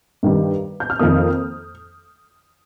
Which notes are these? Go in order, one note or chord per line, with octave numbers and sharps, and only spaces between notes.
G2 D#3 G3
G6
F6
F2 D#3 A#3 D#6